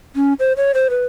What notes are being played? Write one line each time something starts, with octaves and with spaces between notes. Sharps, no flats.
C#4
C5
C#5
C5
B4